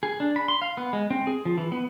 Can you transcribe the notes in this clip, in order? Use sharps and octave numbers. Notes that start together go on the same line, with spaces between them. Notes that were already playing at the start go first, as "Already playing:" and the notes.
G#4
D4
B5
C6
F5
B3
G#3
C4
G#4
F3
E3
B3